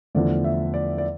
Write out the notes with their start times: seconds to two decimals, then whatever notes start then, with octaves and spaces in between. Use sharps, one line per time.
0.15 E2 D3 F3 A3 D5
0.44 E5
0.74 D5
0.98 D5